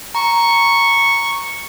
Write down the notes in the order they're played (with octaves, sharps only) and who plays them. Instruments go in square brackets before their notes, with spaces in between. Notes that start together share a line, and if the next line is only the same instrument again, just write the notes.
[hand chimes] A#5 [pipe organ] C#6